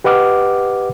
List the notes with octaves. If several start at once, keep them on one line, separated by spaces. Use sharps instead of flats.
G4 B4 D#5 F#5 D6 F6